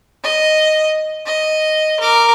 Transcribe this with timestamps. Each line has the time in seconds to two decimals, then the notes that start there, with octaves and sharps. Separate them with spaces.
0.24 D#5
1.26 D#5
2.00 A#4 D6